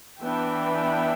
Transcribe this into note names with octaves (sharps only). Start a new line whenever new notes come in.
E3 B3 D4 E5 G5